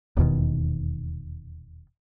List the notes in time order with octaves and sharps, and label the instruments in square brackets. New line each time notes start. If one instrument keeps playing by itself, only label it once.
[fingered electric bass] D#1 E2 B2 D#3